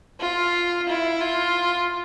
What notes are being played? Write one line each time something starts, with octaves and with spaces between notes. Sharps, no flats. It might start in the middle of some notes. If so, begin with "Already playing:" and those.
F4
E4
F4